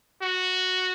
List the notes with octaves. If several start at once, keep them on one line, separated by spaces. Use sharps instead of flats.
F#4